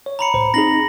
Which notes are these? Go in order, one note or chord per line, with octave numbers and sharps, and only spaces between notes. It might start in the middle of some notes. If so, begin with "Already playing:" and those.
C#5
A#5 B5 C#7
C#2 A2 C5
C4 D#4 G#4 A#6 F#7